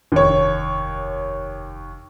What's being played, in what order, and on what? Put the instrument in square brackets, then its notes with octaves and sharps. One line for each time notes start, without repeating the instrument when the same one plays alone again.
[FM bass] F1 [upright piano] D#2 C#5